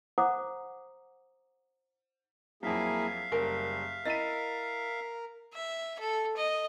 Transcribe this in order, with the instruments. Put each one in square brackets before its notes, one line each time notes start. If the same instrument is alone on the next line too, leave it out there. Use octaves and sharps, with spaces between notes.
[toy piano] C5 F#5 A#5 D6 D#6
[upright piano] F2 F#3 [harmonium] A#3 E4 G#4 [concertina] E5 F5
[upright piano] F#1 [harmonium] G3 [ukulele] A#4
[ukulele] E4 D#5 [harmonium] A#4 [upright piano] A6 B6 D#7
[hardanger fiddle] E5
A4
D#5